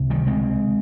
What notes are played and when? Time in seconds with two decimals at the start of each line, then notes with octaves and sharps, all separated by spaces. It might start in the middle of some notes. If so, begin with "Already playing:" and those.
Already playing: C#2 C3
0.10 D#3 G3
0.26 G#3 C4